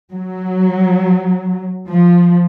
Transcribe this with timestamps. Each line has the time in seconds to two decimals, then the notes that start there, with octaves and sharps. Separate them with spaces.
0.13 F#3
1.89 F3